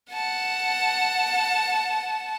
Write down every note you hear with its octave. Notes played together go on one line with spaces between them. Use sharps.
F#5 A5